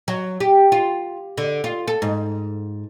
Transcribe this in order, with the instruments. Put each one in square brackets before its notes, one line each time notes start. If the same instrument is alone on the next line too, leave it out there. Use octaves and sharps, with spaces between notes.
[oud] F#3
G4
F4
D3
F4
A4
G#2